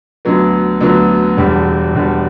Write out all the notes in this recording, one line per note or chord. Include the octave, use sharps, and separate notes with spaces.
D2 D3 F#3 B3
D2 D3 F#3 B3
E1 E2 D3 G3
E1 E2 D3 G3